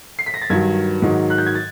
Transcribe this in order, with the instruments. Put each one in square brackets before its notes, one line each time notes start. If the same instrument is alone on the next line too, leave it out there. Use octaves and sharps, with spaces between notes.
[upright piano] C7
B6
A#6
A6
G2 D#3 F#3 G#6
G#2 D#3 F#3
F#6
G6
G#6
A6